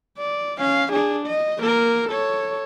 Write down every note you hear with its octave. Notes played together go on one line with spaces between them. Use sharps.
D5
C#4 F5
D4 G#4
D#5
A#3 A#4
A4 C#5